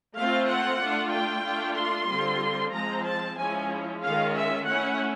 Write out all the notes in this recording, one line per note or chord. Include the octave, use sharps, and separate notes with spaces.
A3 C4 F4 F5
F#5
A3 D4 F4
G5
A3 D4 F4
C6
D3 G3 C4 F4
F3 G#3 C4 A#5
A5
F3 G#3 C#4 E4 G#5
D#3 G#3 C#4 F4 F5
E5
A3 C#4 E4 F#5